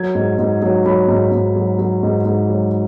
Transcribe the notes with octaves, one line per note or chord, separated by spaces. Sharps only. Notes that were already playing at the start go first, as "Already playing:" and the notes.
Already playing: F#3 G#6
G#2
G#2
F#3
F#3 B5
G#2
G#2
F#3
F#3
G#2
G#2
F#3